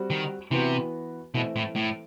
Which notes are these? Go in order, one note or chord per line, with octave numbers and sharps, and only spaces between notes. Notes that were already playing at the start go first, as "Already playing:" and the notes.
Already playing: G3 C4 F#4
D#3
C3 E3 B3 F#4
B2 E3 A3 C4
A2
A2